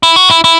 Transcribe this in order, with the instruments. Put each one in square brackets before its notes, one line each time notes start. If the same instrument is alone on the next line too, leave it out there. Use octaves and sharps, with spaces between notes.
[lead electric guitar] E4
F#4
E4
E4